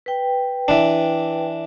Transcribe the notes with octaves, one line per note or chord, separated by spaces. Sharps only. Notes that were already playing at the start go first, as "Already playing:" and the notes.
B4 G5
E3 D4